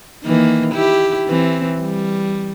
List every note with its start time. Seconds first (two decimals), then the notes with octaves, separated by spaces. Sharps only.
0.24 D#3 E3 A#3
0.74 E4 G4
1.28 E3 C4
1.80 G3